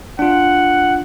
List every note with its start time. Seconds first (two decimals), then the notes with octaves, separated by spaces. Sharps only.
0.19 D4 F4 F#5